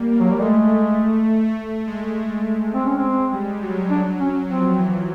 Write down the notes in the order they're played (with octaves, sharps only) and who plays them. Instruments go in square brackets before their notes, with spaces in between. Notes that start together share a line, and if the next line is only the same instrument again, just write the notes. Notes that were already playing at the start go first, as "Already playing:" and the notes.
Already playing: [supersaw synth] G3 A#3
A#3
[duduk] F#3
G3
[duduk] G#3 [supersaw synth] A3
[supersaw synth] A3
G#3
[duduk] C4
C#4
C4
[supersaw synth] G3
F#3
[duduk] D4
C#4
[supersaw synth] F3 [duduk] C4
[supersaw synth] E3